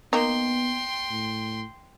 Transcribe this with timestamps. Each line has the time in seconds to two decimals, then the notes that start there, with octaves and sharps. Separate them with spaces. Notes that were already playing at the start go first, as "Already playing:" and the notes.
0.13 A#3 B3 D#4 G5 C6
1.11 A2